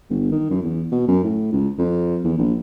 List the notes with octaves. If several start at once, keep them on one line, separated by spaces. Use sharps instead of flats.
G1
D#3
F#2
E2
B2
F#2
A2
C#2
F2
E2
A#1